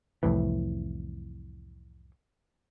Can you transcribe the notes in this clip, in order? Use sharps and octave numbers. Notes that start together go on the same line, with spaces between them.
C2 F2 A2 E3